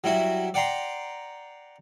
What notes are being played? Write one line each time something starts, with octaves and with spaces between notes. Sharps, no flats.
F#3 G3 E4 F#4
D5 F#5 G5 A#5 C6